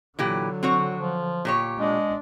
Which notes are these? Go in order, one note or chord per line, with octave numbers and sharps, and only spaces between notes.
A#2 D3 E3 F#3 G4
C4 F#4 C#5
F3
A#2 G4 C#5
G#3 D4